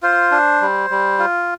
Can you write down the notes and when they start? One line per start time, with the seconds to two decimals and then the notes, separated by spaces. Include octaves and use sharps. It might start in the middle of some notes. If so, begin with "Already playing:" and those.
0.03 F4 C5
0.31 D4
0.61 G3
0.90 G3
1.19 F4